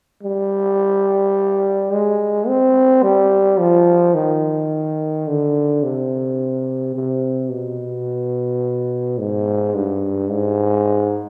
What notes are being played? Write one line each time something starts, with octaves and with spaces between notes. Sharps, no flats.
G3
G#3
C4
G3
F3
D#3
D3
C3
C3
B2
G#2
G2
G#2